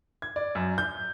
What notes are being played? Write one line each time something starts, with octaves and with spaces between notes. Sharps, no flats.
G#6
D5
F#2
G6